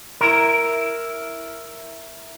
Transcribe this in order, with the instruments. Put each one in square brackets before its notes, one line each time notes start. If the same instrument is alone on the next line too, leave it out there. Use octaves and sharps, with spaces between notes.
[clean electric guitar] E4 A#4